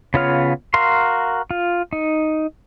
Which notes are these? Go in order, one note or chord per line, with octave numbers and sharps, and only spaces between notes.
C#3 B3 F4 C#5 F6
F#4 A#4 F5 C6
F4
D#4